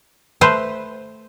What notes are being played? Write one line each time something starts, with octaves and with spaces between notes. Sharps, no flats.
A3 B4 C5